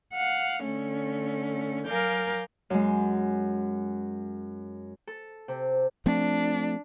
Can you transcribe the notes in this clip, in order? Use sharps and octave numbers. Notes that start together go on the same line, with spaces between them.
F5 F#5
D3 A3 C#4
F#3 A#4 F5 G#5 D6 G6
F#2 G#3
A4
C3
F3 A3 C4 D4